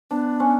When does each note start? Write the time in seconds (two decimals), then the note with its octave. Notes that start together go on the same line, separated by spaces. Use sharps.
0.11 B3 D4
0.40 C#4